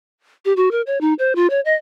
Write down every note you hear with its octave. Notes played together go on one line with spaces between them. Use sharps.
G4
F#4
A#4
C#5
D#4
C5
F4
C#5
D#5